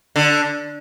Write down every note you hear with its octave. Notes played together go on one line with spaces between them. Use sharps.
D3